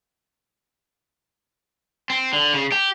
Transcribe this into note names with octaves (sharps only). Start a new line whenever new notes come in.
C4
D3
C#3
G4